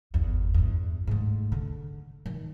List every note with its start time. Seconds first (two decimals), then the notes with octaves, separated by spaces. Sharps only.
0.14 G1 E2
0.54 E2 G2
1.07 G#2 A3
1.52 D3
2.26 D#3 E3